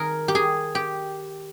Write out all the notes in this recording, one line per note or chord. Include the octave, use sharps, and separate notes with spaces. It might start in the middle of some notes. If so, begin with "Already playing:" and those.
Already playing: D#3 G#4 A#4
G4
G#4
G4